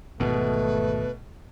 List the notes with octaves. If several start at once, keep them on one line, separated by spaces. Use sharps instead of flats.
G#1 E2 B2 A3 B4